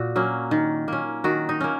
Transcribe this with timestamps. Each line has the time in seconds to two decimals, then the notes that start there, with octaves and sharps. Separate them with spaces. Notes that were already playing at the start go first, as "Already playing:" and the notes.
Already playing: A#2 F#4
0.16 F#3 A#3 C#4
0.51 D#3
0.88 A#3 C#4
1.24 D#3 F#4
1.49 D#4
1.61 A#3 C#4